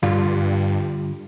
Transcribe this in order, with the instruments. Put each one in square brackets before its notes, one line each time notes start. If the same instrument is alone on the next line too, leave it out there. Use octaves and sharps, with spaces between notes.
[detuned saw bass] G2 [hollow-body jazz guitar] D3 G3 F4